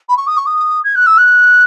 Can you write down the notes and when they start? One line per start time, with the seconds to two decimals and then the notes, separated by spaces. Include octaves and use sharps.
0.09 B5
0.17 C#6
0.27 D#6
0.37 C#6
0.46 D#6
0.84 G#6
0.95 F#6
1.06 E6
1.17 F#6